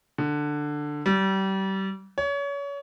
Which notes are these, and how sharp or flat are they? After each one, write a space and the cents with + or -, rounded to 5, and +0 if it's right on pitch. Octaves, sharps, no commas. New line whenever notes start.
D3 +10
G3 -30
C#5 +30